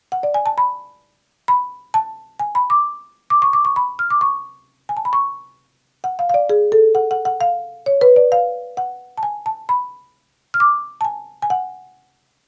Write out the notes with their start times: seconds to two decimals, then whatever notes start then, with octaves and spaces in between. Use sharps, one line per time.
0.12 F#5
0.23 D5
0.34 G#5
0.46 A5
0.58 B5
1.48 B5
1.94 A5
2.40 G#5
2.55 B5
2.70 D6
3.30 D6
3.42 C#6
3.53 D6
3.65 C#6
3.76 B5
3.99 F6
4.10 D6
4.21 C#6
4.89 G#5
4.97 A5
5.05 B5
5.13 C#6
6.04 F#5
6.19 F5
6.30 F5
6.34 D5
6.50 G#4
6.72 A4
6.95 F#5
7.11 F#5
7.25 F#5
7.41 F5
7.86 C#5
8.01 B4
8.16 D5
8.32 F5
8.77 F#5
9.18 A5
9.23 G#5
9.46 A5
9.69 B5
10.54 F6
10.60 D6
11.01 A5
11.05 G#5
11.42 G#5
11.50 F#5